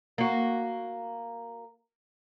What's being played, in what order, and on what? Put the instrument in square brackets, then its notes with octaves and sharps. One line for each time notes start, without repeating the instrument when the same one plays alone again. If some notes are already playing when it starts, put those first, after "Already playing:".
[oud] A#3 F#4